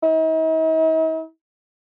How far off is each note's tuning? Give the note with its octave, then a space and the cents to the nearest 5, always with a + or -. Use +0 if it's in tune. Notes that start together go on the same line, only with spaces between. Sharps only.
D#4 +45